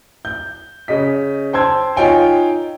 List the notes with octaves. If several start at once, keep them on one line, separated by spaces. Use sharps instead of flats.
G6
C#3 D#5 B6
C5 G5 A5 C6 E6 G#6
D#4 F4 C#5 G5 G#5